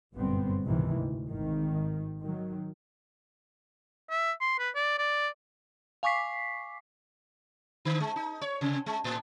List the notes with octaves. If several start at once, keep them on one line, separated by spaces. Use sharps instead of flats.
G1 F#2 A#2 G3 B3 C4
C#2 G#2 C3 D#3 E3
D2
G#1 D#3
D#3 F#3
E5
C6
B4
D5
D5
F5 G#5 C#6 D6 B6 C7
D3
G#3
D#4
C#5
C3
G#3
A2